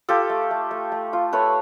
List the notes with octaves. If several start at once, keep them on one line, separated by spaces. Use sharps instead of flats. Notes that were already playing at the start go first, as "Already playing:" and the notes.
F4 G4 A4
A3
A3
A3
A3
F4
A3 B4 C#5